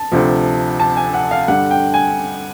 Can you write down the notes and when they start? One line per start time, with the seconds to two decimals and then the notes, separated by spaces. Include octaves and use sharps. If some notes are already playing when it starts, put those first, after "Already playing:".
Already playing: A5
0.12 D2 C3 F3
0.80 A5
0.97 G#5
1.14 F#5
1.31 F5
1.48 G2 D3 G3 F#5
1.71 G5
1.94 G#5